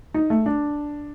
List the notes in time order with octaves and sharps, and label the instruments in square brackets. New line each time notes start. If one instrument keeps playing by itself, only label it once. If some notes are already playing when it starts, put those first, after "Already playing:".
[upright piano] D#4
A3
D4